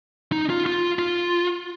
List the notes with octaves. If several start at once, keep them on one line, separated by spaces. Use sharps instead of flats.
D#4
F4
F4
F4